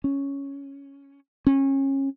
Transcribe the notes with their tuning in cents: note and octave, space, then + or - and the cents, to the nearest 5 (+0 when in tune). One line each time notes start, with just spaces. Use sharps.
C#4 +5
C#4 -25